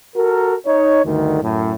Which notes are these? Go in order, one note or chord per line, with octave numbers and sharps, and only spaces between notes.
F#4 A4 A#4
D#4 C#5
D2 G2 D3 D#3
F#2 A2